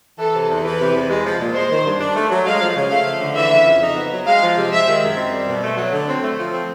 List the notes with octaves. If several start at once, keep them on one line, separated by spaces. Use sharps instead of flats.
E3 A4
C3
E2
E3 B4
C3
E2
G#3
F3
A#2
G#3 C5
D#3
G2
D4
A3
F#3
G#3 F5
F3
C#3
A3 F5
F3
D3
E3 E5
C#3
F2
D#4
B3
F#3
G#3 F5
F3
C3
G#3 E5
D#3
F#2
C4
G3
B2
A3
F#3
D3
C4
A3
F3
C4